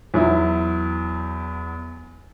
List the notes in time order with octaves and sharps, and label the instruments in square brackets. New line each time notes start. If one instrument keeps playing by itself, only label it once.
[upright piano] E2 F#3 E4